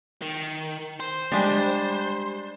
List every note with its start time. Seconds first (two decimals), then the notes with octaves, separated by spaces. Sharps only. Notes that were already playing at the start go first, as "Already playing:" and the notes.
0.22 D#3
1.00 C5
1.32 G3 G#3 D4 G4